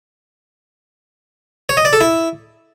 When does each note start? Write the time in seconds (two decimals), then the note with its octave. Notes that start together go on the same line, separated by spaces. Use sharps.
1.69 C#5
1.77 D#5
1.85 D5
1.93 A4
2.01 E4